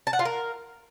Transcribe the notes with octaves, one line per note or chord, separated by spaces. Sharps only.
A5
F#5
F4
A#4